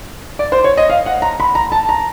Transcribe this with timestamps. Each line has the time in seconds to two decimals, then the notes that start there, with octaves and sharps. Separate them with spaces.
0.39 D5
0.52 C5
0.64 C#5
0.77 D#5
0.90 F5
1.06 F#5
1.22 A#5
1.40 B5
1.55 A#5
1.72 A5
1.89 A#5